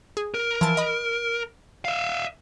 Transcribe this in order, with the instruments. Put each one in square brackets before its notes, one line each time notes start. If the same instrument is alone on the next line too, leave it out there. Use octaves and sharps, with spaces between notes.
[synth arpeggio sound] G#4
[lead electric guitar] A#4
[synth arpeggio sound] E3 F3 A5
D#5 B5
[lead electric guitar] E5 F5